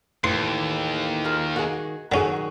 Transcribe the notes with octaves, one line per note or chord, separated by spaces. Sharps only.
D#2 A2 E3 C6
F4 G#4 A#4
D#3 F#4 G#4
F#2 D3 D#3 C#4 F#4 G#4